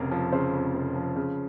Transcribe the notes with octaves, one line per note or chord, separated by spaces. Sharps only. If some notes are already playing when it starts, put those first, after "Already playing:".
Already playing: F1 F2 C#3 A#4
F3
C#3 C5
F2
F1
F3
C#3